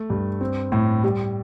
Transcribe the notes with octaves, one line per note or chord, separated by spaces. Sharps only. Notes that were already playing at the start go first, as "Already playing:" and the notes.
Already playing: A3
G2
C4
A2
G3